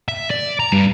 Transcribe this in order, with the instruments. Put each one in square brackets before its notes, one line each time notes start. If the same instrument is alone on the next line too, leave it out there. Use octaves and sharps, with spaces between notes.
[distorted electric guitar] E5
D5
A#5
G2